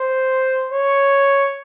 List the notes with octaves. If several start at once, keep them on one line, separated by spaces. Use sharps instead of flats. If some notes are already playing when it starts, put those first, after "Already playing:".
Already playing: C5
C#5